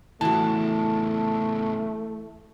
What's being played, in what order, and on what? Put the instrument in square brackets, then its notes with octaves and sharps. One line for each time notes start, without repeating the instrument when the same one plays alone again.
[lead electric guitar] A2 C#3 [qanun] E3 F#4 [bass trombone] A3 [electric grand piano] A5